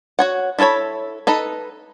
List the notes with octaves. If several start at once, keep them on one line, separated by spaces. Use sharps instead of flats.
F#4 C#5 F#5
E4 F4 A4 C#5 B5
D#4 A4 B4